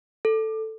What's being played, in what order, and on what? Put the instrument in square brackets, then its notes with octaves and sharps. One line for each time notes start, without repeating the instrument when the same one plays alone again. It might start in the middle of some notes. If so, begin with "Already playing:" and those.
[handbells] A4